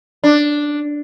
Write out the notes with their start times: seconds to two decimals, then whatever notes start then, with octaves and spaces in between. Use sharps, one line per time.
0.24 D4